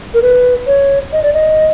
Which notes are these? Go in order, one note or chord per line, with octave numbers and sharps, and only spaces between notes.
A#4
B4
C#5
D#5
D5
D#5